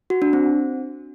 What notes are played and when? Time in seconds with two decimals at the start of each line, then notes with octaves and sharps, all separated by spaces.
0.10 F#4
0.22 D4
0.33 C4